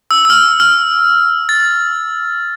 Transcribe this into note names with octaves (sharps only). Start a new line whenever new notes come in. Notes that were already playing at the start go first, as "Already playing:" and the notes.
E6
E6
F6
F6
A6